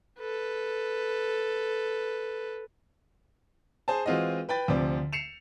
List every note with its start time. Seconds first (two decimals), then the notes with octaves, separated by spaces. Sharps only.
0.20 A4 B4
3.88 G#4 C5 G#5 A5
4.06 E3 G#3 C4 F4 F#4 D#5
4.49 B4 G5 B5 A6
4.68 D2 C3 F3 D5
5.13 C7 C#7 E7 F7